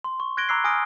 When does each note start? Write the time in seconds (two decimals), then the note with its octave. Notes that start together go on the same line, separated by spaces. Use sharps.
0.04 C6
0.20 C#6
0.37 F#6 G#6 A#6 D7 G7
0.49 A#5 B5 D6 E6 F#6 C7
0.64 G#5 D#6 F6 A#6 D7